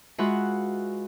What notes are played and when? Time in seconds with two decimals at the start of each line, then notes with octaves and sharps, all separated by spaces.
0.18 G#3 F4 F#4 B4 E5 F#5